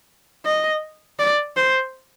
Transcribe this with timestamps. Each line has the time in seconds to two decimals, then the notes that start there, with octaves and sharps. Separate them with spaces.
0.45 D#5
1.19 D5
1.57 C5